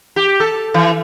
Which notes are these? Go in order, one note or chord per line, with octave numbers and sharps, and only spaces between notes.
G4
A4
E3